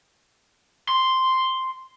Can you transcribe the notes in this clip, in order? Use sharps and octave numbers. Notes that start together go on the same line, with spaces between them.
C6